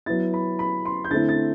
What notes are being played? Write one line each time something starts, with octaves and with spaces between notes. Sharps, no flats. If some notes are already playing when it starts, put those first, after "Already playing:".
F#3 B3 E4 A6
B5
B5
C6
G6
D3 A3 C4 E4 A6
A6